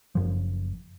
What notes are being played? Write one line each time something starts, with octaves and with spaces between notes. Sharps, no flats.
F#1 F#2 F3